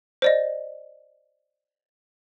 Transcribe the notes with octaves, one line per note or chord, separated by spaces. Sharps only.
C5 D5 D#5